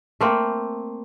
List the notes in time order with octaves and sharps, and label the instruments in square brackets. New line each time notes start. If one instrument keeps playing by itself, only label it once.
[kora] A3 A#3 C4